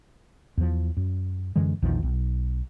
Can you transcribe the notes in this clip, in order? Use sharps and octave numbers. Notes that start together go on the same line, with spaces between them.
E2 F3
F#2
F#2 D3 E3 G#3
A#1 E2 D#3 F3
B1